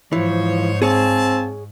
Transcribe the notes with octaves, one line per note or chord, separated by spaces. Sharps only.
G#2 E3 F3 C5 C#5
C4 G#4 C#5 F5 G#5 A5